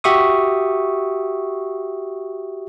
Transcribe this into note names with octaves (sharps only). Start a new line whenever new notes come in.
F#4 G4 E5 C#6 D#6